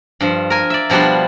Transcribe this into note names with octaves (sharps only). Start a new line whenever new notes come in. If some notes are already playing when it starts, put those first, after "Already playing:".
G2 F3
A#4 G#5
D5 E5
B2 F3 G3 B3 D4